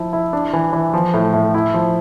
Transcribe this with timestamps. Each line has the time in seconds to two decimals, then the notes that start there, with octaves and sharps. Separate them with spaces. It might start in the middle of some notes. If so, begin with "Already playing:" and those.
Already playing: F3 E4
0.13 E4
0.33 D4
0.53 E3
0.73 E3
0.94 F3
1.14 A2
1.33 A2
1.54 E4
1.74 F3